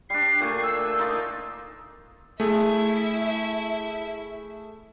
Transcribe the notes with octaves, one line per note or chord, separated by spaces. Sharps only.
G3 D4 C7
A#2 A3 G#5
E6
D#4 F4 D5
A3 E4 G#4 E5